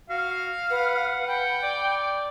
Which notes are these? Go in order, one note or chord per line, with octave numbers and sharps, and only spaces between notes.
F#4 F5
B4 F#5
F#5 G5 B5
D5